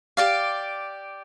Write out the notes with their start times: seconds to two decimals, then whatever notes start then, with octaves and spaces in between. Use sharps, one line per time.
0.17 G4 D5 F5